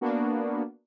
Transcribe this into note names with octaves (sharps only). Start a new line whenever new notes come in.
A#3 B3 D4 F#4